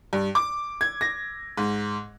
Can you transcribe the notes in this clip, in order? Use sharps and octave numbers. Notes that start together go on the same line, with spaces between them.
G2
D6
G#6
A#6
G#2